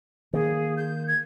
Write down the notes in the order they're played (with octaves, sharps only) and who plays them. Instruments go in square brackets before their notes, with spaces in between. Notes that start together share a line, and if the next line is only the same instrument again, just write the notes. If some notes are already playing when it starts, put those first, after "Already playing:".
[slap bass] D#3 A#3 [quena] G#4
[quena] G6
G#6